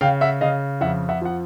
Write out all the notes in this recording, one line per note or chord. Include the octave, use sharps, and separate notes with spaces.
C#3 F5 G5
E5 F#5
C#3 D#5 F5
F2 E5 F#5
E5 F#5
F3 F#5